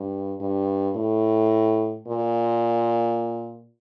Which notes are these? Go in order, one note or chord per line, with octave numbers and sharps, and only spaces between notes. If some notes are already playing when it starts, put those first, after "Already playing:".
Already playing: G2
G2
A2
A#2